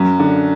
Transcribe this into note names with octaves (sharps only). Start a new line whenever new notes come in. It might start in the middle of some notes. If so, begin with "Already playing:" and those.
Already playing: F#2
D3